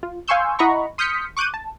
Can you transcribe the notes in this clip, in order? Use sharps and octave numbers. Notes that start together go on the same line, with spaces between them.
F4
F5 G#5 C6 C#6 E6 G6
E4 D#5 F#5 A#5 B5 C#6
C6 D#6 F6 G6 B6 C#7
C#6 D6 F#6 G6 D#7
A5